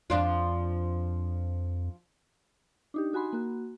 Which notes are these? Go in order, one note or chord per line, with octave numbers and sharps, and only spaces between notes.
F2 F3 D4 F4
D4 D#4 G4
D#4 F#4 G#5 B5 C6
A#3 F#4